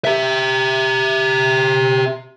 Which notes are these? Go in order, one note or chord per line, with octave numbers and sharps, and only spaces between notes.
G4 E5